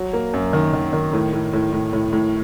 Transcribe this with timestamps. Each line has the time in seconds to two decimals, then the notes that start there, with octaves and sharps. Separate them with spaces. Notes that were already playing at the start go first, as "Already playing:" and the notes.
Already playing: F#3
0.13 A#3
0.34 F#2
0.53 D#3
0.74 D#3
0.93 D#3
1.13 A2
1.33 A2
1.53 A2
1.73 A2
1.93 A2
2.13 A2